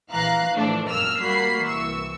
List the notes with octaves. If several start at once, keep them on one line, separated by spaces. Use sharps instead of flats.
A#1 E3 F5 A#5 F#6
A2 E3 F3 A3 D4
G#1 F#2 A#2 A#3 E6 F6
G3 A#3 F#4 B5 C7
C2 E3 C#6 E6